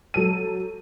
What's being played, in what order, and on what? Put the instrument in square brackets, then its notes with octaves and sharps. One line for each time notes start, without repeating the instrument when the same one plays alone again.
[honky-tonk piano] F#3 A4 D#7